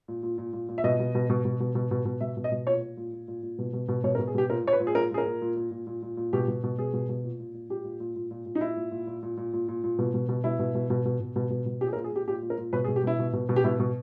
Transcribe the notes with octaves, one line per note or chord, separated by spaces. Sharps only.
A#2
A#2
A#2
A#2
A#2
E5
B2 D#5
B2
B2
B2
B2
B2
B2
B2
B2
B2 E5
B2
D#5
B2
A#2 C#5
A#2
A#2
A#2
A#2
A#2
B2
B2
B2
B2 C#5
A#4
B2
G#4
B2 G4
A#2 A#4
A#2 C#5
B4
A#2
G#4
A#2 A#4
A#2 G#4
A#4
A#2
A#2
A#2
A#2
A#2
A#2
A#2
B2 G4
B2
B2
B2 G#4
B2
B2
A#2
A#2
A#2
A#2 G4
A#2
A#2
A#2
A#2
A#2
D#4
A#2 E4
A#2
A#2
A#2
A#2
A#2
A#2
A#2
A#2
B2
B2
B2
B2 E4
B2
B2
B2
B2
B2
B2
B2
B2
A#2 G4
G#4
A#4
A#2
G#4
A#2 G4
A#2 G4
A#2
A#4
A#2
B2 B4
G#4
B2
G4
B2 E4
B2
B2
B2
G4
B2 E4
B2